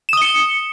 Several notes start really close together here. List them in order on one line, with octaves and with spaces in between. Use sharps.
E7 D#6 G7 C#7